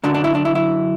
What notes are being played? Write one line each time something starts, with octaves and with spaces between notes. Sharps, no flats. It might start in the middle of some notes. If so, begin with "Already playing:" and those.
F#2 D3 F#3 D4
D4
E4
D4
E4
E4